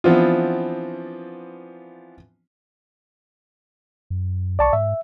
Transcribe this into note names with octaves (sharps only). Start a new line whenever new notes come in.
E3 F3 B3 C4 D4 F4
F#2
B1 D5 A5 C#6
G#2 E5